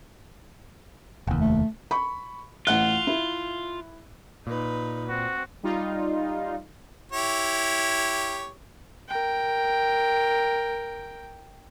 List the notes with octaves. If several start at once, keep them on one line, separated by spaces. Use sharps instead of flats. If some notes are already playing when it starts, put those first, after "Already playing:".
F1 D#2
A3
B5 C#6
A1 F4 F#5 F#6
E4
A#2 D#4 B4
C4 F#4
G3 D#4 F4
E4 G4 C#5
A#4 G5